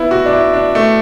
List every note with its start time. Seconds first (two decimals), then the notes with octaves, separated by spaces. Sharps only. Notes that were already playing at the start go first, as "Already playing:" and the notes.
Already playing: B3 E4
0.11 F#4
0.26 D4
0.33 E4
0.53 D4
0.75 A3